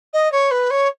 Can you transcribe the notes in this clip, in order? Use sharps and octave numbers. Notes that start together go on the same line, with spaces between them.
D#5
C#5
B4
C#5